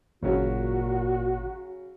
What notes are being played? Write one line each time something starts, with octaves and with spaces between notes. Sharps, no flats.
G#1 A#2 C#3 F#3 C#4 F#4